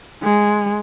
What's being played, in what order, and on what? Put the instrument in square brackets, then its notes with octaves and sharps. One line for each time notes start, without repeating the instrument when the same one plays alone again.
[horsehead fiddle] G#3